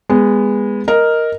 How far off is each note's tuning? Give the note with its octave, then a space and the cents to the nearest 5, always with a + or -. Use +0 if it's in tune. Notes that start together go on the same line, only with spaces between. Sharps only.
G#3 -15 B3 +0
A#4 +0 D#5 +0